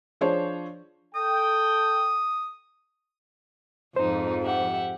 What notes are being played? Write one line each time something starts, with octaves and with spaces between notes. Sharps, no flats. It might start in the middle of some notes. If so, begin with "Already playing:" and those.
F3 D4 G#4 C5 C#5
A4 G5 D#6
F2 G#2 F3 D#4 C5
G4 E5 F#5